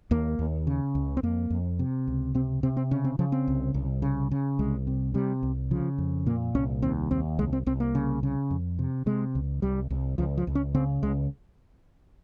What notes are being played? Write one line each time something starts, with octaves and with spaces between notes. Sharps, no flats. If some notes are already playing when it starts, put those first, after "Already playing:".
D#2 A#3
D#2
C#3
C#2
C4
F2 A#3
F2
C3
C#2
C3 C4
C3 C4
C4
C#3 C#4
C4
C#3 F3
C4
C2
C2
C#3
C#3
C2 G#3
C3
C3 G3
C2
C#3 F3
F2
A#2 A#3
C2 C#4
D#2 C4
D#2 C4
C2 G#3
C4
C2 C4
A#3
C#3
C#3
F2
C3
C3 G#3
C#2
C2 G3
C2
C#2 F3
F3
C#2
C#4
C#3 C4
C#2 G#3